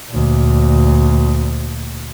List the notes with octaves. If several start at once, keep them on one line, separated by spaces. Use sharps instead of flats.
D2 A#2